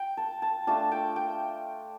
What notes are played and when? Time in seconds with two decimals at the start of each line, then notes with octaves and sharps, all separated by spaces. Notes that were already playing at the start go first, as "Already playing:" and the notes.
Already playing: F4 G5
0.17 A5
0.42 A5
0.67 A3 D4 F4 A5
0.91 G5
1.16 G5